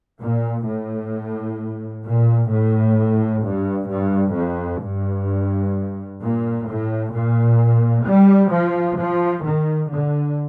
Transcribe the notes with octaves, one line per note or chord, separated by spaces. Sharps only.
A#2
A2
A#2
A2
G2
G2
F2
G2
A#2
A2
A#2
G3
F3
F3
D#3
D3